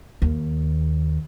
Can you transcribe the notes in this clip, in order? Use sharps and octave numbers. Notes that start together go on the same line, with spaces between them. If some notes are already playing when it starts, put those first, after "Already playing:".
D#2